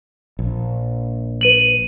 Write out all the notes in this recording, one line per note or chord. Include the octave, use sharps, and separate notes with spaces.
A#1
B4 D#7 F#7